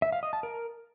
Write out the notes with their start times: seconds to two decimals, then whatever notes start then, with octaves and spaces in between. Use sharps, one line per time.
0.02 E5
0.12 F5
0.23 D#5
0.33 A5
0.43 A#4